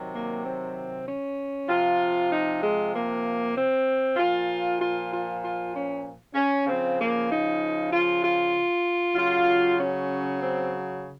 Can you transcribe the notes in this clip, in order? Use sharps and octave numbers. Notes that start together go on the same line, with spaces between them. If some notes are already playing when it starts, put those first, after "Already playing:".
Already playing: C3 D#3 F#3
A#3
C4
C#4
C3 F3 F4
D#4
G#3
A#3
C4
A#2 F3 F4
F4
F4
F4
C#4
C#4
C#3 F3 C4
A#3
D#4
F4
F4
C#3 F#3 F4
C#4
C4